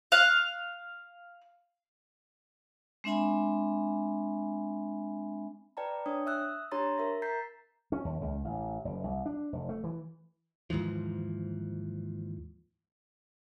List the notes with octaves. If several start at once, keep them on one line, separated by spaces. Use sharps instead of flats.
F5 F#6
G#3 C4 D4 E5 G#5 B5
B4 D5 G5 A5 A#5
D4 C#5 G5 D#6
E5 D#6 E6 F#6
D4 G4 C#5 A#5 C6 A6
A#4 E5 A#6
A#5 G6 A6 B6 C7
C#4
D#2
C#2
A1
F#1
C2
D4
F1
A3
E3
D#2 G#2 E3 F3